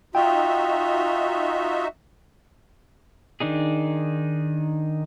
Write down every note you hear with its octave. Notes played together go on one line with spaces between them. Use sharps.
D#4 F4 F#4 E5 G5
D#3 D4 D#4 G#4